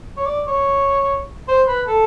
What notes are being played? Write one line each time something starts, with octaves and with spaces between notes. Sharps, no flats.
C#5
D5
C#5
C5
B4
A4